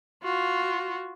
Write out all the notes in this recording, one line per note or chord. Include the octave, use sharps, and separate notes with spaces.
F4 F#4